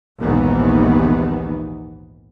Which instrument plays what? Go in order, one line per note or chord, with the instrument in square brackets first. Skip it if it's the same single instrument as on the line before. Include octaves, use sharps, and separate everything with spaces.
[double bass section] A#1 D#2 G#2 D#3 E3 B3